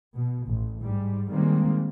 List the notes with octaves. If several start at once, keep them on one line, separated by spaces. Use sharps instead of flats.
B2
A1
G#2 G3
D#3 G3 G#3 A#3 C4